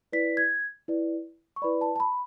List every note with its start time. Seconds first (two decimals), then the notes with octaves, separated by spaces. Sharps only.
0.13 E4 B4 D5 B6
0.37 G#6
0.88 E4 B4 D5
1.56 C#6
1.62 E4 B4 D5 B5
1.81 A5
1.96 A5
2.00 B5